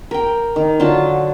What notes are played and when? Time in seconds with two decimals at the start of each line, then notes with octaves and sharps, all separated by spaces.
0.11 A#4 G5
0.56 D#3
0.80 D3 F#3 F4 A5